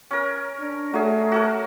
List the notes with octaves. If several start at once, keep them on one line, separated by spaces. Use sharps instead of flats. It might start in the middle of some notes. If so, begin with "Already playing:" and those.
C#4 A#4
D4
F#3 A3 G#4
F#4 A4 A#4